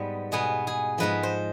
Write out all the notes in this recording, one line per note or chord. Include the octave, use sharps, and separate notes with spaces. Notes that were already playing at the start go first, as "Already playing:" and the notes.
Already playing: G#2 G3 B3
B2 B3 G#4
G#4
G#2 F3 G#3 B3 B4
C5